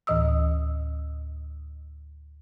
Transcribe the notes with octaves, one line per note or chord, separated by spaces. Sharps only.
D2 A2 E3 D#5 D#6 E6